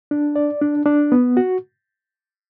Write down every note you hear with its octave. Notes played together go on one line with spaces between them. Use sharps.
D4
D5
D4
D4
B3
F#4